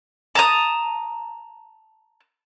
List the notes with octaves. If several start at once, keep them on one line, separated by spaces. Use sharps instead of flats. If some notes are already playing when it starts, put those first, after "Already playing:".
A5 A#5 D#6